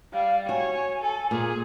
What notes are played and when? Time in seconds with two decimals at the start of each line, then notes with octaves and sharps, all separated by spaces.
0.13 G3 F5
0.49 F#4 C#5 G#5
1.01 A4
1.31 A#2 G#4